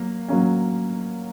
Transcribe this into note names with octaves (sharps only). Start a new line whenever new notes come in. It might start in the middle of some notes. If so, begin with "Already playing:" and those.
Already playing: F#3 A#3
F#3 A#3 C#4